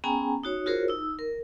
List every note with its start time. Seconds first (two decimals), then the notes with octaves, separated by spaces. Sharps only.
0.04 B3 C#4 G#4 G5 G#5 A#5
0.43 D#4 F#4 C#5
0.66 F4 F#4 G#4 A#4 C5 C#5
0.88 D#4 E6
1.19 A#4